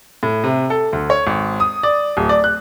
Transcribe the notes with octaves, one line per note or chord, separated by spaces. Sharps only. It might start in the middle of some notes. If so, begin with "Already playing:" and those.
A2
C3
A4
D2
C#5
G#1
D#6
D5
D1
D5
F#6